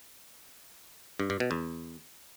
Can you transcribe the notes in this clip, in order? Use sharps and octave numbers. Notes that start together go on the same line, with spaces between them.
G2
G2
B2
E2